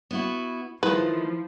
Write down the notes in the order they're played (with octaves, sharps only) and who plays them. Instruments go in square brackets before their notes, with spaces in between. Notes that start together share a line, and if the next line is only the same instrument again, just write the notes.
[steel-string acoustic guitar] B3 E4 F#4
[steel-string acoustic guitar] D#3 A3 [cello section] F3 [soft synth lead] E4 [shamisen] B4